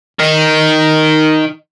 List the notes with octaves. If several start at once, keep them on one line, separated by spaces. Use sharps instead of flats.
D#3 D#4